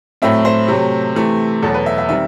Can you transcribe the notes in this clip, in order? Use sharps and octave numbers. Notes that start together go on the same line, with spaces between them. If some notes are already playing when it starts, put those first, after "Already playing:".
A2 F#3 A3 C4 E5
C5
C3 F#3 A3
C3 E3 A3
E2 B2 F#3 A4
B4
E5
E5
D#3 G3 C4 E5